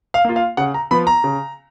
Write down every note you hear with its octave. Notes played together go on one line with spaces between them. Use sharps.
F5
A#3 F4
F5
C#3 F#5
A#5
F3 B3 F4 B5
A#5
C#3